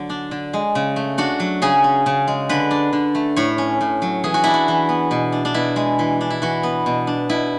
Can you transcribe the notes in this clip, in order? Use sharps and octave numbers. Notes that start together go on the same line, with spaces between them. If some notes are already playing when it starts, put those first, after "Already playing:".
Already playing: D3 F#3
D4
D3
G#3
C#3
A3
D4 F#4
F#3
C#3 G#4
C#4
C#3
G#3
D3 B4
D4
D3
A3
A2 C#5
C#4
A2
F#3
E3 G#4
F#4
D4 E4
F#4
E3
B3
B2
D4
D4
B2 E4
G#3
E3
D4
E4
E3 F#4
B3
B2
D4
B2 E4